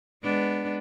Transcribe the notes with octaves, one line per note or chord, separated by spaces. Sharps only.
G#3 B3 D4